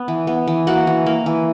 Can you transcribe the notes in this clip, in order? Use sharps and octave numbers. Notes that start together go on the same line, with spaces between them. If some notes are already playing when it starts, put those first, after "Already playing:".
Already playing: B3
E3
B3
E3
A#3 F#4 F#5
E3
A#3
E3